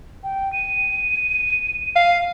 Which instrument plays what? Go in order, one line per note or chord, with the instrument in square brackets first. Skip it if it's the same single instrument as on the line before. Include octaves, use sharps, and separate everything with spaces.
[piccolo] G5
D#7
[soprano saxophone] F5